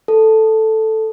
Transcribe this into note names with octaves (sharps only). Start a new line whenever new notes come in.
A4